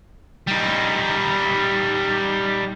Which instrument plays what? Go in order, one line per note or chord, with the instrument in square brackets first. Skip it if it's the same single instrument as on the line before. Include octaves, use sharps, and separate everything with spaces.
[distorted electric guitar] G3 D#4